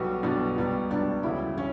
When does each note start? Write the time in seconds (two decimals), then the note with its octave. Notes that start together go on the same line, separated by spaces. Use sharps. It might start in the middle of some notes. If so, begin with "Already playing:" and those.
Already playing: B1 B2 G3 F#4
0.23 B1 B2 G3 D4
0.56 C#2 B2 G3
0.90 C#2 B2 G3 D4
1.23 D2 C#3 G3 E4
1.57 C#3 C#4